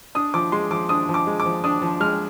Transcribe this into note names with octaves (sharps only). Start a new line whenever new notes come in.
D4 D#6
F3 D6
G#3 C6
F3 D6
D4 D#6
F3
D6
G#3
D6
F3
D4 D#6
F3
G#3 F6